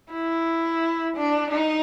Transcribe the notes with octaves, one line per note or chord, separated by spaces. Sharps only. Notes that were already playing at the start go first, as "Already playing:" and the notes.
E4
D4
D#4